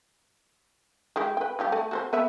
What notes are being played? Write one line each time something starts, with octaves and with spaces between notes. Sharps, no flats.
G#3 E4 G4
B4 G5
G3 F4 G4
A3
F#4 A4 C5
B3 B4 E5